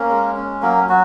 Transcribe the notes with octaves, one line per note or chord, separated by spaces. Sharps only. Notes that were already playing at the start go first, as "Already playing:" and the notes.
Already playing: A#3 C#4 A#4
G#3
C#4
F#3 A#3 A#4
F#3 F#4